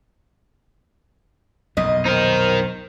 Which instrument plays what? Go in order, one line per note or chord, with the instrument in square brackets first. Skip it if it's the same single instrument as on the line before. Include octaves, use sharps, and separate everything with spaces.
[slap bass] B1 F2 A#2 [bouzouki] D#5
[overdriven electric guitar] D#4 A#4 [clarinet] C5